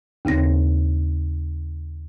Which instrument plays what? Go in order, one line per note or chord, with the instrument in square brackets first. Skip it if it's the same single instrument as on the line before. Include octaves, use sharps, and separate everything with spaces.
[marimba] D#2 C#3 C4 A#6